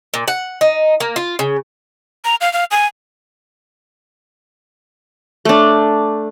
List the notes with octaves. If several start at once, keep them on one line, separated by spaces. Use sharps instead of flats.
A#2
F#5
D#4
A#3
F4
C#3
A#5
F5
F5
G#5
A3 D4